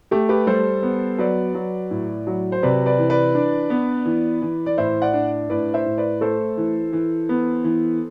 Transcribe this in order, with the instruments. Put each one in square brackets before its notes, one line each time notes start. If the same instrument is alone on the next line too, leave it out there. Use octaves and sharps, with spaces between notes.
[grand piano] A3 G4
G4 B4
G3 A4 C5
B3
F#3 B4 D5
F#3
A2
F#3
C5
C3 B4 D5
B4 D5
E3
B4 D5
D4
B3
E3
E3
D5
A2 C5 E5
D5 F#5
D4
A2 B4 D5
C5 E5
A2
B4 D5
A3 A4 C5
E3
E3
B3
E3